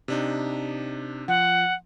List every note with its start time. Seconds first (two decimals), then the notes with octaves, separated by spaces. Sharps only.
0.08 C3 D4 D#4
1.28 F3 F#5